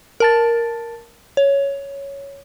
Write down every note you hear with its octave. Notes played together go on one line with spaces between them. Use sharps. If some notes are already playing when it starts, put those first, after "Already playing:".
A#4 A5 A6
C#5